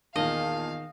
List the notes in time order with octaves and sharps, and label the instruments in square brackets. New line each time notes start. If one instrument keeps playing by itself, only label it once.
[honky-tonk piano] E2 A#2 A5 [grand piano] D#3 [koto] D#5 [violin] F5